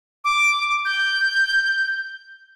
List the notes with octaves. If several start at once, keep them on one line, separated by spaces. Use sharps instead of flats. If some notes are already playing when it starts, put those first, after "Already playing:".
D6
G6